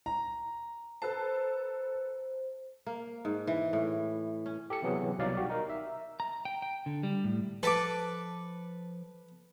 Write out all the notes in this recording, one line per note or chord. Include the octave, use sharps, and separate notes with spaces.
A#5
A4 B4 C5 A5
A#3
G#2
E3
A2
C#4
G4 A4 C#7
C3 E3 F#3 B3 G#4
C2 B2 F#3 D#4 D5 F5
F#4 G4
D#4 A#4
E5
A#5
G5
G5
D3
G3
A2
F3 A4 B4 A5 D6